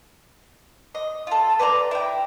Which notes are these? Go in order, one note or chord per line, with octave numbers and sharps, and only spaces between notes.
D#5
F4 A4
B4 D5 G#5 A#5
E4 G5